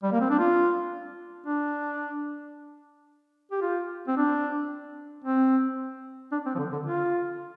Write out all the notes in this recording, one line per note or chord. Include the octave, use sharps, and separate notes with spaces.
G3
A#3
C4
D4
F4
D4
G4
F4
C4
D4
C4
D4
C4
F3
D3
D3
F4